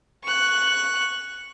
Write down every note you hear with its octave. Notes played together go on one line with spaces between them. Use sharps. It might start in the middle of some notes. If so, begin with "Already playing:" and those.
C#6 F#6